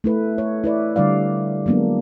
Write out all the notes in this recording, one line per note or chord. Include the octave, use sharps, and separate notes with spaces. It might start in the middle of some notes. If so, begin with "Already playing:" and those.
A3 E4 B4
C#5
E4 B4 D5
D3 G3 D5 F5
F#3 G#3 A#3 B3 D4